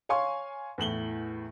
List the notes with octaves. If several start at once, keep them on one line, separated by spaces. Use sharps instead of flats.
C#5 F5 G#5 C6 C#6
E2 A2 F#7 G7